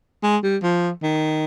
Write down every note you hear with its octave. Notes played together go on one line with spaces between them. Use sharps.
G#3
G3
F3
D#3